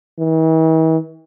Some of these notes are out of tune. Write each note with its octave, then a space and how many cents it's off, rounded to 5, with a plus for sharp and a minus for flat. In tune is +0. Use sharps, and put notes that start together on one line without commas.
E3 -45